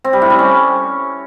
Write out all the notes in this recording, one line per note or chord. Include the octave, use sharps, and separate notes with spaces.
C4
G3
A2
G3
C#4